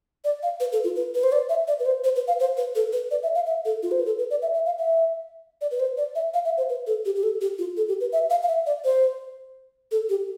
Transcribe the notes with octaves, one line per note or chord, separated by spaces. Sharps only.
D5
F5
B4
A4
F4
B4
B4
C5
D5
E5
D5
B4
C5
C5
B4
F5
C5
B4
A4
B4
D5
E5
F5
E5
A4
F4
C5
B4
A4
B4
D5
E5
E5
F5
E5
D5
B4
C5
D5
E5
F5
E5
C5
B4
A4
G4
G4
A4
G4
F4
A4
G4
B4
E5
F5
F5
E5
D5
C5
A4
G4